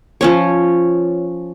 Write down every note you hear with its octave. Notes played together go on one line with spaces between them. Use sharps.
F3 C#4 C#5